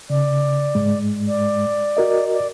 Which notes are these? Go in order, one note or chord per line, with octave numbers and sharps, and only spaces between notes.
C#3 D5
G#2 G#3
D5
F#4 A#4 D#5
D5